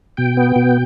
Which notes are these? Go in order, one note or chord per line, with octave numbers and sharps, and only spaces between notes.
B2 G5
B3
B2